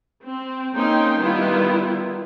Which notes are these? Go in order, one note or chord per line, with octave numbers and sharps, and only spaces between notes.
C4
A#3 C4 C#4 D#4 G5 C6
D#3 G3 B3 E4 F4